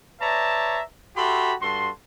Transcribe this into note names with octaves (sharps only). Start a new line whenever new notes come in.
B4 C#5 D5 E5 A5 A#5
F#4 G4 A4 E5 B5 C6
G2 F#4 A4 C6